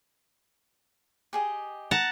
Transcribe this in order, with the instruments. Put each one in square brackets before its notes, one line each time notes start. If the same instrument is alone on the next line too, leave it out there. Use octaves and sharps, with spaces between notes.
[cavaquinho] G4 G#4 D#5
[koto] F#5 A5 A#5